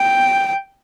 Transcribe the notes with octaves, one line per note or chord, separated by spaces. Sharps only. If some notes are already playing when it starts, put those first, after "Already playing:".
Already playing: G5